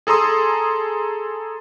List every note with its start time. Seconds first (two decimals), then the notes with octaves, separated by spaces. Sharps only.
0.07 G#4 A4 A#5 C6 D#6